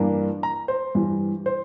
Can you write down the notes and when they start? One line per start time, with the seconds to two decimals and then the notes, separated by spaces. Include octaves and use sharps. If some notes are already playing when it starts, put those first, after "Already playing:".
Already playing: G2 E3 A#3 D4
0.43 A#5
0.68 C5
0.95 G2 E3 G3
1.46 C5